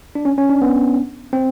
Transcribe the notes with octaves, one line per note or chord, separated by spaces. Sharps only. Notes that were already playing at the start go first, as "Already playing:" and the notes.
D4
C#4
C#4
D4
B3
C4